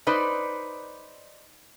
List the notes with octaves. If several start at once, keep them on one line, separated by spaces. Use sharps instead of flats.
D#4 B4 C5 D5